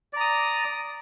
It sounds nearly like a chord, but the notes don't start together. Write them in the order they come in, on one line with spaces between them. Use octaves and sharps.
D5 A#5 D#6